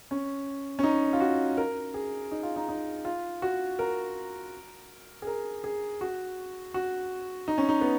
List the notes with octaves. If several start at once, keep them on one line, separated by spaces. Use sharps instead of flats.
C#4
C#4
D#4
F4
F#4
A#4
G#4
D#4
F4
D#4
D#4
F4
F#4
A#4
G#4
A#4
G#4
F#4
F#4
D#4
C#4
D#4
B3